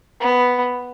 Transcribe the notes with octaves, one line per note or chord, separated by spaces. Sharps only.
B3